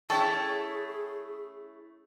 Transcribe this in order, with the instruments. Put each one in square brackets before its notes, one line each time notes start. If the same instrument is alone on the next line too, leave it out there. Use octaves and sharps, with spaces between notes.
[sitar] A3 C#4 E4 [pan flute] G#4 [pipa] A4 [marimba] G5 C#6